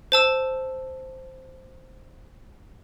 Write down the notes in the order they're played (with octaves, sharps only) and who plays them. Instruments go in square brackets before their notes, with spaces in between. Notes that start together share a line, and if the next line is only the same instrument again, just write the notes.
[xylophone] C5 A5 E6